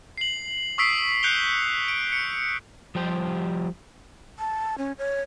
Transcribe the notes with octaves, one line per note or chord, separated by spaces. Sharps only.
C7 F#7
C#6 D#6 E6 B6 C7 D7
F#6 G6 C#7 D7 F7 G7
D7
C#7
F3 G3 G4 C5
A5
C#4
C#5